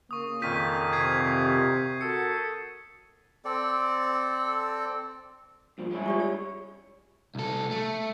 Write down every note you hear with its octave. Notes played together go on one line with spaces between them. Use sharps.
C#3 A#3 C#6 D#6
F2 A#2 D#3 G6 B6 D#7
C3 G#6 C7 D#7
F#4 A4 A#4 C#7
C4 A4 D5
G2 A#2 F3
G3 G#3 C#4 E4
F4 G4 D5
G#4 C#5
C2 A4
A3